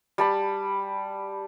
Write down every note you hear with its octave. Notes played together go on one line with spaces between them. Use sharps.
G3 A5 B5